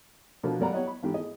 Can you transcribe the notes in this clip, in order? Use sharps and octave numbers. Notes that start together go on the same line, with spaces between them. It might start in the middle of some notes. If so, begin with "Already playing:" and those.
B2 F3 A#3 D4
F#2 G3 A#3 D5 F#5 A#5
G4 C#5 D#5 F#5
B5
A1 G#2 D#3 G4
G#4 D#5